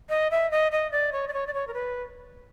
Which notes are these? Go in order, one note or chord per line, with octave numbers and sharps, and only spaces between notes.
D#5
E5
D#5
D#5
D5
C#5
D5
C#5
D5
C#5
A#4
B4